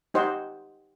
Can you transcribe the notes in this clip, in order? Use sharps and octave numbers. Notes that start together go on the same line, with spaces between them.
D#4 G4 C5 D#5 F#5